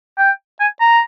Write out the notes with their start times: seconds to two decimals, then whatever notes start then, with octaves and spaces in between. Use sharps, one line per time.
0.18 G5
0.60 G#5
0.81 A#5